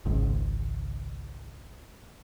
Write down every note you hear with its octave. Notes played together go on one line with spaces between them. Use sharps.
G#1 C#2